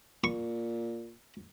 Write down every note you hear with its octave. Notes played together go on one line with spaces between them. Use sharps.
A#2 C#6